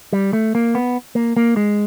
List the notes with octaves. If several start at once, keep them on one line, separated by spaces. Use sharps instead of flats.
G3
A3
A#3
B3
A#3
A#3
G#3